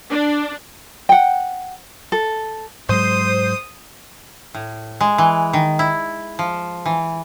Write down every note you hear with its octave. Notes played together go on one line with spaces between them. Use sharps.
D4
F#5 G5
A4
G#2 F#3 G#3 C5 D#6
A2
G#3
E3
D#3
E4
F3
E3